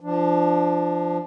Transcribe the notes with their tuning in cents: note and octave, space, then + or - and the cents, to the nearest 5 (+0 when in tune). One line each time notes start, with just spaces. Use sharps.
F3 -15 D4 +10